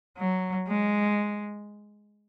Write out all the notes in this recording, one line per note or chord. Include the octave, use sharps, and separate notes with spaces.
F#3
G#3